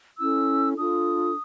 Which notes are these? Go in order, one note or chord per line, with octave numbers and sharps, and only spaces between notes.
C#4 E4 A4 E6
D4 F4 A4 D#6